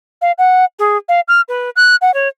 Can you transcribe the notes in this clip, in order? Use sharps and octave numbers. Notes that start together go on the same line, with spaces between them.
F5
F#5
G#4
F5
F6
B4
F#6
F#5
C#5